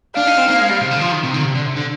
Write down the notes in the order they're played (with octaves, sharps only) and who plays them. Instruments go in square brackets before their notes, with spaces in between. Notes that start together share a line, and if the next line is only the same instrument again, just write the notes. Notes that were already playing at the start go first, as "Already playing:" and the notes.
[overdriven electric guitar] D4 [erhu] F5
[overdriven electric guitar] D#4
C4
A#3
G#3
G3
C3
D3
F3
D#3
C3
D3
C3
D3
C3
D3